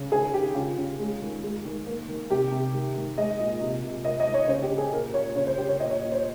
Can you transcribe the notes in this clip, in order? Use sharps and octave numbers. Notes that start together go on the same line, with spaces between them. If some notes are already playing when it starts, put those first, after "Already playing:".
Already playing: C#3
D#3 G#4
D#3 G4
C#3 F4
C#3
G#3
D#3
G#3
D#3
A#3
D#3
C3 G4
C3
D#3
D#3
G#3 D#5
A#2
C3
C3
A#3 D#5
D#5
D#3
C#5
C#3 C5
G4
C#3
G#4
A#2 A#4
A#2 C#5
C#3 C#5
C5
C#3 G4
C#5
A#2 D#5
C#5
A#2
C5